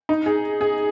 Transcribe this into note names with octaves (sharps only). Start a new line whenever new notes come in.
D#4
G#4
G#4